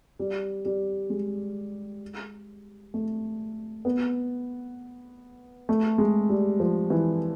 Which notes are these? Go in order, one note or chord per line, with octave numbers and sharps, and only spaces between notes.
G3
G3
G#3
A3
B3
A3
G#3
G3
F3
E3